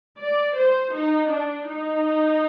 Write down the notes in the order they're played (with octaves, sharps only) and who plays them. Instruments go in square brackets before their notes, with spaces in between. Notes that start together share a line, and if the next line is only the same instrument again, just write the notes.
[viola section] D5
C5
D#4
D4
D#4